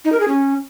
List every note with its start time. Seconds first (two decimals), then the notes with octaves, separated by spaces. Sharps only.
0.05 D#4
0.12 A#4
0.20 G#4
0.28 C#4